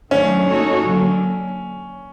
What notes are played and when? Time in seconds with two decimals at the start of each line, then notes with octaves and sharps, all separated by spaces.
0.11 D#3 F#3 A3 C#4 D4
0.48 A#3 D#4 F#4 A4 C#5
0.84 D3 F#3 A#3